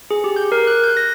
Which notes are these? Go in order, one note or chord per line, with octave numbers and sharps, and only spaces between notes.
G#4
G4
G6
A#4
F#6
G6
A#6